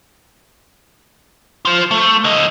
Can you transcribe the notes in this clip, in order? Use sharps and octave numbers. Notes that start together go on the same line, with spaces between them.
F4 C5
A3
D3 D#5